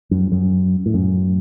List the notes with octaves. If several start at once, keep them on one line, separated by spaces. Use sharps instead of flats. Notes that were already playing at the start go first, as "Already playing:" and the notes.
F#2
F#2
A2
F#2